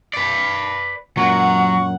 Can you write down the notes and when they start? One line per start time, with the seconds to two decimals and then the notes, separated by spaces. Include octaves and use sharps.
0.13 B4 D5
1.17 F#2 A#2 F#3 F#5 C#6